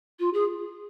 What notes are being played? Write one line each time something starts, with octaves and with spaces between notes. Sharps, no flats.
F4
G#4